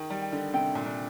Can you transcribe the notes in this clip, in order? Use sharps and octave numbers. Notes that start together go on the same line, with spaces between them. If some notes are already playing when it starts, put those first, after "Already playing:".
Already playing: D#3 G#4
G3
G5
D3
C3 G5
A#2
D4